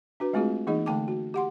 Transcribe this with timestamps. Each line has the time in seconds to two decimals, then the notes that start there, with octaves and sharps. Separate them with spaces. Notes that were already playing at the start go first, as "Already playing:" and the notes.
0.20 D4 F#4 B4
0.33 G#3 A3 C4 F4 F#4 G#4
0.67 E3 A#3 D#4 G#4 D#5
0.86 D3 A3 G5 A5 D6
1.08 F#4
1.34 G4 F#5 C6